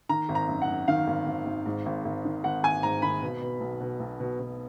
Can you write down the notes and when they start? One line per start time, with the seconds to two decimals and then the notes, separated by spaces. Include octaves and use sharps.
0.09 D#3 A#5
0.29 G#1
0.35 A#5
0.49 F#2
0.62 F#5
0.68 F#2
0.88 D#3 F5
1.07 G#1
1.26 G#1
1.46 G#1
1.66 G#2
1.86 G#1
2.05 G#1
2.25 D#3
2.44 G#1 F#5
2.63 G#1 G#5
2.83 G#2 A#5
3.02 D#3 B5
3.22 B2
3.42 B2
3.60 B1
3.81 B2
4.00 B1
4.20 B2
4.39 B2